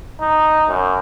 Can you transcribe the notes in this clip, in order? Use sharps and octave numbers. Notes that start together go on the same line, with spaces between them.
D#4
F#2